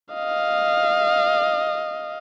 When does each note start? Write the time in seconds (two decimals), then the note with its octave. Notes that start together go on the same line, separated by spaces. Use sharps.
0.15 D#5 F5